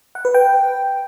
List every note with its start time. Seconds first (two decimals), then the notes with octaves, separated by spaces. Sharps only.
0.15 F#5
0.25 B4
0.34 G5